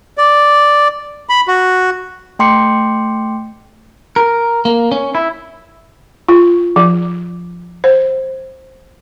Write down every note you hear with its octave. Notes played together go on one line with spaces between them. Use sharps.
D5
B5
F#4
A3 G5 C6 D6 C#7
A#4
A#3
C#4
E4
F4
F3
C5